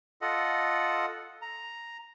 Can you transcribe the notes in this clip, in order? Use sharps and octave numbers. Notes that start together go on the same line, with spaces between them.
F4 A4 D#5 F#5
A#5